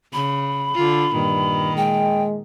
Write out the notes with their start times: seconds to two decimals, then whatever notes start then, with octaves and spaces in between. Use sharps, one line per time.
0.13 C#3 B5
0.75 D3 F4
1.14 G2 A#2 D#3
1.77 G#3 G5